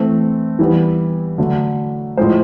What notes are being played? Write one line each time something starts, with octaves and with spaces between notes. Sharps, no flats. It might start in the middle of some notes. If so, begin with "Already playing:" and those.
Already playing: E3 A3 C4
E3 G3 B3
D3 F#3 A3
A2 F3 G#3 C5